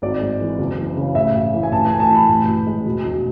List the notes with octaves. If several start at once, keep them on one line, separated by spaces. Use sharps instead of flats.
G#1 D5
G#3
E3
F#1
E3
C#3
A1 E5
A1
E3
G#5
A1 A5
G#5
A3
A5
E3
B5
A1
A1
G#3
E1
E1